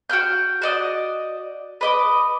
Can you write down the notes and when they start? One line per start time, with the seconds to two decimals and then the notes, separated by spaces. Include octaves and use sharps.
0.10 F#4 G5 F6 G6
0.62 F#4 D5 D#5
1.81 B4 D#5 D6